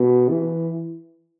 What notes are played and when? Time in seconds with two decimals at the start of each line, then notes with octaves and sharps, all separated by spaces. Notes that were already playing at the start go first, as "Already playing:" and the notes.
Already playing: B2
0.29 E3